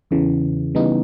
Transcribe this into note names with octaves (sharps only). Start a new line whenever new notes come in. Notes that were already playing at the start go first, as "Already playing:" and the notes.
E2 C#3 E3
C#3 E3 G3 B3 D#4